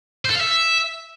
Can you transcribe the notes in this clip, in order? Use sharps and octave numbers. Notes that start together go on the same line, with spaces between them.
C5
A4
F5
E5